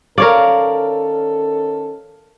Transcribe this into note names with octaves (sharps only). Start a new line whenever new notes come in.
D#3 C#4 A4 A#4 C#5 D5 F5